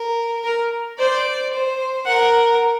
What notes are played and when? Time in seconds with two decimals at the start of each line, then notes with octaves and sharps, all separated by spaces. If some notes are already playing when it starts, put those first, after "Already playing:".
Already playing: A#4
0.44 A#4
0.99 C5 D5
1.53 C5
2.07 A#4 F#5